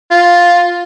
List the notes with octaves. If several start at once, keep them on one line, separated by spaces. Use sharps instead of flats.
F4